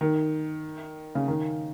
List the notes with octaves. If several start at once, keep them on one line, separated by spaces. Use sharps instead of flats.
D#3
C#3
D#3